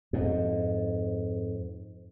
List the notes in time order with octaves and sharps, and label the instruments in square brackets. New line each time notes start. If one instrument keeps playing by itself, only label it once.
[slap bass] F2 G#2